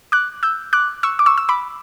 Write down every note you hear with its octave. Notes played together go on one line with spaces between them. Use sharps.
D6 F#6
E6 G6
D6 F#6
C#6 E6
D6
C#6 E6
E6
B5 D6